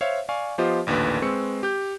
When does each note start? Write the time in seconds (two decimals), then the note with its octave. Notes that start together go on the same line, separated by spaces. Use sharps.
0.01 C5 C#5 E5 F5
0.29 D5 F5 G#5 C#6
0.58 F3 B3 F4 G4 C5 D#5
0.87 A1 D#2 A#2 D3 B4
1.22 G#3 C4 B4 C#6 E6 C#7
1.63 G4 G6